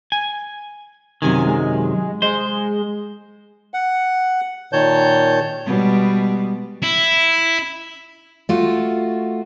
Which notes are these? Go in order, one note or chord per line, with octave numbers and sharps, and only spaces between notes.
G#5
F#2 C3 D#3 G#5
G#3
G#3 C5
F#5
A#2 D#3 C#5 A5 G6
B2 G3 G#3
E4
A3 F4 F#4